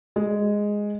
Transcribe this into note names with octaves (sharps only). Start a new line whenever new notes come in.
G#3